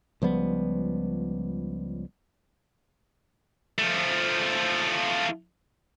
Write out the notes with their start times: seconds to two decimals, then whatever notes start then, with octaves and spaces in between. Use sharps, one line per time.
0.22 C#2 F3 G3 B3
3.79 F3 A3